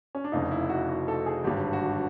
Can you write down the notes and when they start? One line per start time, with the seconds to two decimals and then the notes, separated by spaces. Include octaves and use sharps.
0.15 C#4
0.24 D4
0.32 F1 F2 C#3 D#4
0.51 E4
0.69 F#4
0.89 F#4
1.08 A4
1.26 G#4
1.44 G#1 G2 D3 G4
1.73 F#4